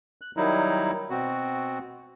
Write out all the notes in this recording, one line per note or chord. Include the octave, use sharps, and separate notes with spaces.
F#6
D#3 F#3 G3 D#4 E4
B2 C4 F#4